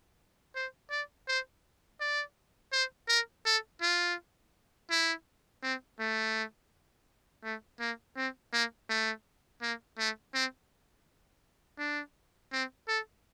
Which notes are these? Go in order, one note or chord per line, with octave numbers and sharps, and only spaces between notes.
C5
D5
C5
D5
C5
A#4
A4
F4
E4
C4
A3
A3
A#3
C4
A#3
A3
A#3
A3
C4
D4
C4
A4